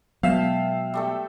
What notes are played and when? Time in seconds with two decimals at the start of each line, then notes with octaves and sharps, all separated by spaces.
0.23 B2 F#3 G#3 E5 F5 G5 A5 E6
0.94 G3 A3 A4